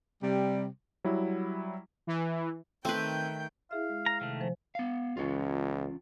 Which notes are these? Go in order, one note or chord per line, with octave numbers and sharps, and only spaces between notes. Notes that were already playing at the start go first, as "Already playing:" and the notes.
C3 G3
F#3 G3 E4
E3
D#3 A3 C4 B4 G5 G6
E4 G#4 E5 F5
G#3
A#5
C3 D#3 A3
F3 C5 G#5
B3 F5
C#2 E3 C#4 F4